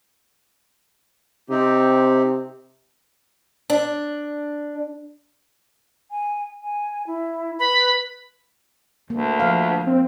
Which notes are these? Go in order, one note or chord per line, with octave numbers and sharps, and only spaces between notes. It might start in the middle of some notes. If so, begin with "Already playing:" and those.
C3 C4 D#4 G4
D4
G#5
G#5
E4
B4 B5
D2 A#3
F3 F5
C4